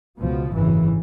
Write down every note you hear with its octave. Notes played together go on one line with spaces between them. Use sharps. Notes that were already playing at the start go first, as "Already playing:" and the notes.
C#2 B2 F3
G#1 F#2 C#3 E3